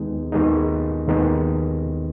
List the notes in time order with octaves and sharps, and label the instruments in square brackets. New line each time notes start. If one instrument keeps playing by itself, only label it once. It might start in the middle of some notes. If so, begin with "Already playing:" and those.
Already playing: [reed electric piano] D#2 D#3 G#3 B3 D#4
D#2 D#3 G#3 B3 D#4
D#2 D#3 G#3 B3 D#4